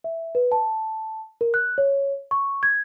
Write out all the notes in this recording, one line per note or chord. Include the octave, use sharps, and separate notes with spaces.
E5
B4
A5
A#4
F#6
C#5
C#6
G#6